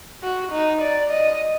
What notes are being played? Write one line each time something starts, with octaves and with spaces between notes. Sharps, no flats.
F#4
D#4
D5
D#5